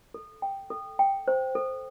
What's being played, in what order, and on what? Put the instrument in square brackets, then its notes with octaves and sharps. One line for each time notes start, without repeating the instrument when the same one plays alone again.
[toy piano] A4
G5
A4
G5
C5
A4